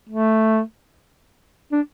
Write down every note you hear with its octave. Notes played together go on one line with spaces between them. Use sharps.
A3
D4